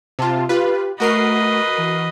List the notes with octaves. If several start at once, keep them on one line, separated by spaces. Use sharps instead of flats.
C3 F4 A5
F4 G4 B4
A3 F#4 A#4 B4 D#5 C7
E3